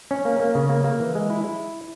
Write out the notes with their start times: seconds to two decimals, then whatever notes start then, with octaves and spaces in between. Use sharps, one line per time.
0.11 C#4
0.25 A#3
0.40 A#3
0.55 C#3
0.69 A#3
0.84 A#3
1.00 E3
1.15 G#3
1.30 E4
1.44 E4